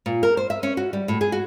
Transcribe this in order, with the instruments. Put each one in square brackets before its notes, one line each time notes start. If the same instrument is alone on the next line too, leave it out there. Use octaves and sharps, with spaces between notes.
[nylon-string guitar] A#2
A#4
C5
E5
C#4
F#4
G3
A2
G#4
F#4